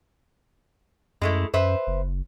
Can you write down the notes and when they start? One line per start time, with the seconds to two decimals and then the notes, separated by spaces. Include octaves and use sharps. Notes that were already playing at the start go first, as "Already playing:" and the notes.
1.21 F#2 G#3 A3 E4
1.54 F#2 B4 C5 E5
1.87 F#1